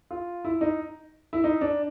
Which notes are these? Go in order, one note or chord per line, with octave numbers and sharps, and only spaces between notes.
F4
E4
D#4
E4
D#4
D4